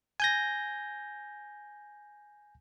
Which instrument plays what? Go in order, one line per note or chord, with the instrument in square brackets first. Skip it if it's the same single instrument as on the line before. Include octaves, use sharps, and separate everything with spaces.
[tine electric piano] G#5 G6 A#6